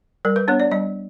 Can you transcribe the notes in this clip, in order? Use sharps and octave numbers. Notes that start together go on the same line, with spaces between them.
G3 A#4
B4
B3 D4 C#5
D5
G3 D#5